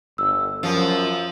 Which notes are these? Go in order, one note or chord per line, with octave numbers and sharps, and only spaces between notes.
G1 E6
F#2 F3